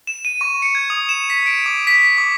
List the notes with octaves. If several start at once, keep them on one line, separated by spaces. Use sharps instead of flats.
E7
D#7
C#6
C#7
G#6
D#6
E7
B6
D7
D6
B6
D6